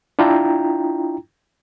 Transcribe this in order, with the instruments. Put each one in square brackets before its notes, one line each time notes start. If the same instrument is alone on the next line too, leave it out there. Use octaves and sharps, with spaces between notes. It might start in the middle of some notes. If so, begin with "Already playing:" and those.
[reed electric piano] D4 E4 F4 G5 A#5